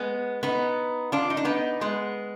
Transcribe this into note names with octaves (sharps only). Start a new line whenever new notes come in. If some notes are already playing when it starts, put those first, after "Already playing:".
Already playing: G#3 B3
B3 D#4
D4 F4
D#4
D4
B3 D#4
G#3 B3